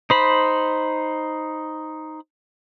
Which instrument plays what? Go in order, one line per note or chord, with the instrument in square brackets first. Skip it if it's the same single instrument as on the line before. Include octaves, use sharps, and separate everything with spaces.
[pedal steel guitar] D#4 C5 B5